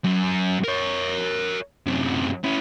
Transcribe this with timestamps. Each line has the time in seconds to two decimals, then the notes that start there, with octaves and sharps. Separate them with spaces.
0.04 F#2
0.64 A#4 C#5
1.86 F#2 C3
2.44 C#4 E4